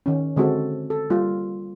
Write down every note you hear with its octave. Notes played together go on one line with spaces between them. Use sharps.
D#3 C#4
D3 G#3 C4 F#4 A4
A4
G3 A#3 F4